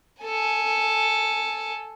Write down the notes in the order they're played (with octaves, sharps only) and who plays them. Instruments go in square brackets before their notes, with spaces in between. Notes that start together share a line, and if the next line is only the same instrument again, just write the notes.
[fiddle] A4 G#5